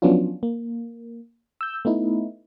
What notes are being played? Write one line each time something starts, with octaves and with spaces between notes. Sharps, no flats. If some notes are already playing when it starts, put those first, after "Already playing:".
F3 F#3 B3 C#4 D4 F4
A#3
E6 G6
A3 B3 D#4 E4